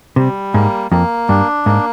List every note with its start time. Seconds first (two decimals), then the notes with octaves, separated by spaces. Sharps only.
0.16 C3 G3
0.54 G#2 A#3
0.91 F2 A#3
1.29 G2 D4
1.66 G#2 A#3